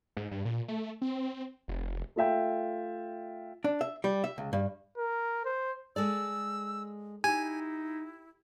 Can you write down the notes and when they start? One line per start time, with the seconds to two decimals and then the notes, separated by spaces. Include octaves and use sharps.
0.17 G#2
0.31 G2
0.45 A#2
0.68 A3
1.02 C4
1.68 F1
2.16 A3 F4 E5 G5
3.64 D4
3.81 E5
4.04 G3
4.24 E5
4.38 C#2
4.53 G2
4.97 A#4
5.45 C5
5.96 G#3 A4 D5 E6
7.24 D#4 E4 G4 G#5